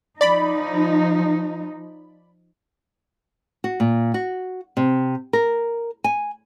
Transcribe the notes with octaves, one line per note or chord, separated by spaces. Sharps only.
F3 D#4 D5 B5
F#4
A#2
F#4
C3
A#4
G#5